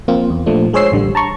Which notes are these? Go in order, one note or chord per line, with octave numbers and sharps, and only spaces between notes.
F3 A#3 C4 F4
E2
A#2 F3 A3 D4
G#3 G#4 C5 C#5 E6 C7
A1 D3 G3
A5 A#5 C#6